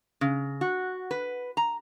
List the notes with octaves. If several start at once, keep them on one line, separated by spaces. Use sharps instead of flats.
C#3
F#4
B4
A#5